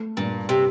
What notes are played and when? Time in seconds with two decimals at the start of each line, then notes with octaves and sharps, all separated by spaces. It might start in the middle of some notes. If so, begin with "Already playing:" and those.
Already playing: A3
0.17 G2 A#2
0.49 C3